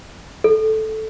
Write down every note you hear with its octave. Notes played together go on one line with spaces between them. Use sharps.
A4